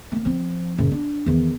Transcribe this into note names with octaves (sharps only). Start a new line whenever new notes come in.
A3 A#3
F3 C4
F#1 A#2
D4
E2 D#3